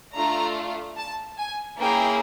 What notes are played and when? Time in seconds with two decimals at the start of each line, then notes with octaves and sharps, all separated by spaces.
0.15 A3 D4 F4 A#5
0.97 A5
1.38 G#5
1.79 A#3 C#4 E4 G#4 G5